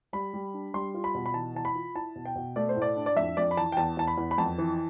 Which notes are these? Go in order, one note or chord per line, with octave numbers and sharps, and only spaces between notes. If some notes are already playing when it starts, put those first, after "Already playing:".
G3 B5
G3
D4
G3 C6
F4
B5
B2
B5
E3 A5
E3 A5
B5
F4
E4 A5
B2
G5
B2
A3 D5
C5
A2
D5
D4
D5
F2 E5
F2 D5
B5
E3 A5
G5
E2 A5
E2 A5
B5
E2
B5
F2 A5
E3